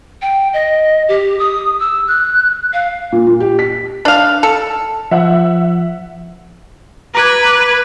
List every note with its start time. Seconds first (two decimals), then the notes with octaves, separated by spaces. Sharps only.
0.22 G5
0.53 D#5
1.09 G4
1.39 D#6
1.80 E6
2.08 F#6
2.73 F5
3.12 A#2
3.27 A#2
3.40 G4
3.59 B6
4.05 D4 F5
4.43 A4
5.11 F3 E5 F#5
7.15 B4 A#5 D6 G#6